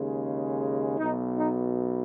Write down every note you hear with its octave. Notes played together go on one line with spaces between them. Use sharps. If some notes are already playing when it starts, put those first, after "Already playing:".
Already playing: D#2 C#3 G#3
B1 B2 B3 D#4
D#4